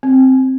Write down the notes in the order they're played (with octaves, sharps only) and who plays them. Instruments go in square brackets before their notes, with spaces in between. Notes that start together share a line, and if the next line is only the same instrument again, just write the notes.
[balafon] C4